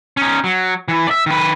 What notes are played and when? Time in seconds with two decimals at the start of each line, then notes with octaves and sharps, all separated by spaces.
0.17 C#4 D#4
0.44 F#3
0.88 E3
1.07 D5 E5
1.26 D#3 B4